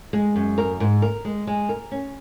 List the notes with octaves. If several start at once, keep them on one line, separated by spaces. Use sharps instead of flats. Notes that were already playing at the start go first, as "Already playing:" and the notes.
G#3
F#2
A#4
G#2
A#4
G#3
G#3
A#4
C#4